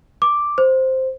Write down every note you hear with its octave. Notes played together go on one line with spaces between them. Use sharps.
D6
C5